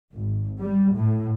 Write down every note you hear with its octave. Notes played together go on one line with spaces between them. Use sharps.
G#1
G3
A2